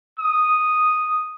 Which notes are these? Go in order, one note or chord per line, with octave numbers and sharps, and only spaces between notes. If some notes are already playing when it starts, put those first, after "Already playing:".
D#6